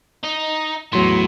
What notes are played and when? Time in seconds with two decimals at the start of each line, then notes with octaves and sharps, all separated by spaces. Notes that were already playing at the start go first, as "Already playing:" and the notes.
0.24 D#4
0.93 E2 A2 F#3 C6